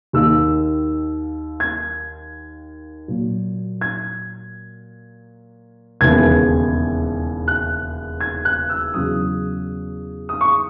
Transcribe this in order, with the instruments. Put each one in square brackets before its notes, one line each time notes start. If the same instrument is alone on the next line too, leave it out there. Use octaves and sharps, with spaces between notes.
[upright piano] D#2 D#3 A#3 E6
G#6
A#2 F#3 A#3
G#6
E1 D#2 C#3 E3 B3 G#6
F#6
G#6
F#6
E6
E2 C#3 F#3 D#6
D#6
C#6